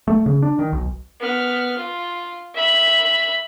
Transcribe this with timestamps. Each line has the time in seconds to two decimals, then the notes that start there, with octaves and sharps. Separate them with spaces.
0.08 A3
0.26 C#3
0.42 D4
0.59 D#3
0.72 B1
1.20 B3 F6
1.78 F4
2.54 E5 B5